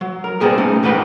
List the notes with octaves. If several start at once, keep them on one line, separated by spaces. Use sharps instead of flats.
F#3
A#4
G3 B3 C4 G#4 A#4
A3 C#4 D#4 A#4
E2 G#2 D#4 B4 G5